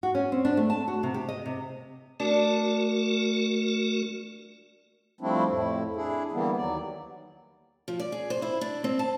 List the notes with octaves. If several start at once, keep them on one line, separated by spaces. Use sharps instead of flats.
F#4
C#4
C4
D4
A3
A5
F#4
C3
G4
D#5
C3
A3 D4 F#4 A#4
F3 G3 A3 C4 D4 E4
F2 A2 E4
D4 E4 G#4
D3 E3 G3 A#3 B3
D#2 F#3 D5
F3
D5
G#4
C5
E4
D4
C4
A5